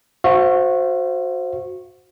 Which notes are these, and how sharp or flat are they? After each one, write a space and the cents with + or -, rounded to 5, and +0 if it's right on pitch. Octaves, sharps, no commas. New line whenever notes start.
F#4 -20 C5 +0 E5 +40